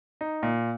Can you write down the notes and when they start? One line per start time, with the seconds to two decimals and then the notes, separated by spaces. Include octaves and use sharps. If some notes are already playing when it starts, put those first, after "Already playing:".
0.21 D#4
0.43 A#2